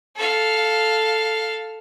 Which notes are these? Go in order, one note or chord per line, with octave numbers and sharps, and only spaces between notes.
A4 F5